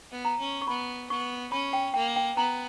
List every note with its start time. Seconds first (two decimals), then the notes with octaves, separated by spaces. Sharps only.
0.11 B3
0.25 A#5
0.39 C#4
0.62 C#6
0.67 B3 B5
1.10 B3 C#6
1.52 C#4 B5
1.73 G5
1.94 A#3 G5
2.16 G5
2.37 B3 A#5